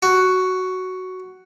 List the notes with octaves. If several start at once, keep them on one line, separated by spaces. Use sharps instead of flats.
F#4